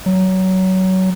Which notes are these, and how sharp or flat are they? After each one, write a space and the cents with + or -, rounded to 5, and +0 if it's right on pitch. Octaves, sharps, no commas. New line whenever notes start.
F#3 +20